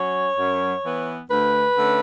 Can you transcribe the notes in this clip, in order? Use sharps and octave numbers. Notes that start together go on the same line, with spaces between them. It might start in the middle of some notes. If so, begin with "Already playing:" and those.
Already playing: F#3 C#4 C#5
F#2
E3 B3
D2 B4
D3 A3 C#4